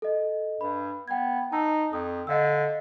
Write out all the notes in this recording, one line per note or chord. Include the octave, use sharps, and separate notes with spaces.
A4 D#5
G2 B5
B3 G5 G#6
D#4 A5 E6
F2 D#6
D3 D#5 F5 E6